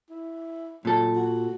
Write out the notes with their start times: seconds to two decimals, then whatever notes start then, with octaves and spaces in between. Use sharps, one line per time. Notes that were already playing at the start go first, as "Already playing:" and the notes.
0.10 E4
0.85 A#2 F#3 A4
1.16 F#4